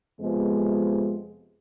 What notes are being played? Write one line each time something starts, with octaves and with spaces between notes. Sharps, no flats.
F2 C3 F3 G#3 B3